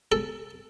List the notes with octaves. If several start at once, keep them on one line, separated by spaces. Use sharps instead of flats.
A4